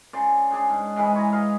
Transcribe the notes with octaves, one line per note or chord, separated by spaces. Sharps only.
C#3 C5 D5
D4 G#4 G5
G#2
G#2 E3 G#3 B4
C#5 A#5
B4 D#5 F5